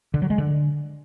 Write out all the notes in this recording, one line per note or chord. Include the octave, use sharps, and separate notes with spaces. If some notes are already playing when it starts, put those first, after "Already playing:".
D3
F#3
G#3
D3